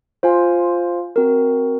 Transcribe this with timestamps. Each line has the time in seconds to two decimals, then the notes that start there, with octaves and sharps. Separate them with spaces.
0.23 F4 C5 F5 G#5
1.16 C4 F#4 A#4